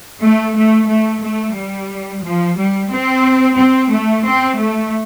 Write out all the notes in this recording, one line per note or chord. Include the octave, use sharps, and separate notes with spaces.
A3
A3
A3
A3
G3
F3
G3
C4
C4
A3
C4
A3